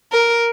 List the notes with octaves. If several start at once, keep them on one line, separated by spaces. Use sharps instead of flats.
A#4